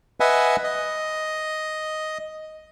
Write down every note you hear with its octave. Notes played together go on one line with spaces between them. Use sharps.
B4 D#5 E5 F#5 G#5
D#5